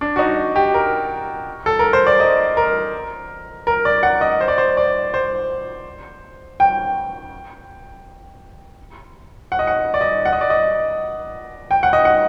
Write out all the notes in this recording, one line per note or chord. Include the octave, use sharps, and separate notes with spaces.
D4
F#4
D#4
G4
A#4
A4
A#4
C5
D5
D#5
A#4
A#4
D5
F#5
D#5
C5
D5
C5
D5
C5
G5
F#5
D#5
F#5
D5
D#5
F#5
D#5
D5
D#5
G5
F#5
D#5
F#5